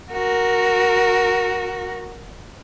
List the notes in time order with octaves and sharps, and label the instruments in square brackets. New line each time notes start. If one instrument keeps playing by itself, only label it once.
[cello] F#4 A#4